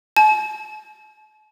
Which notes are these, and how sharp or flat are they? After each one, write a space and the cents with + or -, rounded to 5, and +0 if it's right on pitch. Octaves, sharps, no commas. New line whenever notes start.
A5 -45